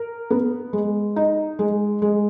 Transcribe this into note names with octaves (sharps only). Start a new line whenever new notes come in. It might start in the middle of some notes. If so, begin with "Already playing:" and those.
Already playing: A#4
B3
G#3
D#4
G#3
G#3